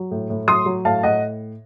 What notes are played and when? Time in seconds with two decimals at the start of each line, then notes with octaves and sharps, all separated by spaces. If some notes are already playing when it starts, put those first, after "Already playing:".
Already playing: F#3
0.11 A2
0.30 A2
0.48 F#3 C6 D#6
0.66 F#3
0.85 A2 F5 A5
1.03 A2 D#5 F#5